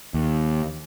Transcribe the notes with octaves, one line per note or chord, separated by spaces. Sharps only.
D#2